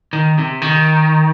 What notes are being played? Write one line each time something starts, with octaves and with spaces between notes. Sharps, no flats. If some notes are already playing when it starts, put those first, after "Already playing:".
D#3
C3
D#3